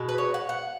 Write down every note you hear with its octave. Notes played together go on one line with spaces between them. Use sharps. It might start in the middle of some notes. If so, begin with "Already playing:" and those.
Already playing: B2 G#3
B4
C#5
F#5
F#5